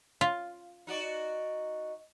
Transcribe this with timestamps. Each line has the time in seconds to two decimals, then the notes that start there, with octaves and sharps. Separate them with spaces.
0.21 F4
0.87 D#4 F#4 D5